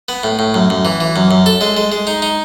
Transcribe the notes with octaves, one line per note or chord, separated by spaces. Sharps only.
B3
A2
A2
F#2
F#2
E3
E3
F#2
F#2
A4
G#3
G#3
G#3
D#4
D#4